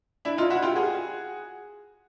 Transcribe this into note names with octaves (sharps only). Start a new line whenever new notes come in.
D4 E4
D#4 F4
E4 F#4
F4 G4
F#4 G#4